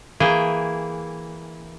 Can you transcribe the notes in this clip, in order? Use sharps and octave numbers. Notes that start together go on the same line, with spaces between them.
E3 A#3 G#4 G5